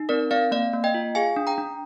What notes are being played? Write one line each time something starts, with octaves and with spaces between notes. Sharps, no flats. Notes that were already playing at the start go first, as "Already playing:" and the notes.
Already playing: D#4
C4 A#4 D5
C4 D5 F5
A#3 D5 F5
A#3
D#5 G5
F4
G#4 F5 G#5
D4
G5 A#5
D4